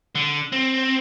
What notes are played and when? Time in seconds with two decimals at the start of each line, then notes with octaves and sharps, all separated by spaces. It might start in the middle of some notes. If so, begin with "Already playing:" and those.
0.15 D3
0.52 C4